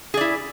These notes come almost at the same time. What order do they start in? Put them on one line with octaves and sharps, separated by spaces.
G#4 D5 E4